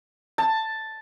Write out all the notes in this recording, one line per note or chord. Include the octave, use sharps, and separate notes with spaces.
A5